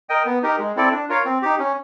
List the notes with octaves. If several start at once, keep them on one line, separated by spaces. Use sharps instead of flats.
A#4 D#5 G5
B3
D#4 G4 A#4
G#3
C4 E4 A4 D5
D4
F4 A#4 C#5 F5
C4
D#4 G4
C#4